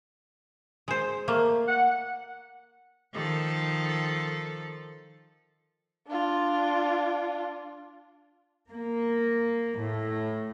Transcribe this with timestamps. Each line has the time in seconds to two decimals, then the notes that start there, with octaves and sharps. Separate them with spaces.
0.88 G#3 C5
1.28 A3 A#3
1.68 F#5
3.15 D#3 F3 A4
6.09 D4 F4
8.70 A#3
9.77 A2